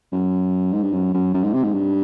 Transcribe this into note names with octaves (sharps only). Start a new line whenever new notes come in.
F#2
G#2
G2
F#2
F#2
F#2
G#2
C3
G#2
G2